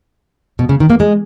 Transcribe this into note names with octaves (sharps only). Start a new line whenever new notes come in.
B2
C#3
D#3
A#3
G#3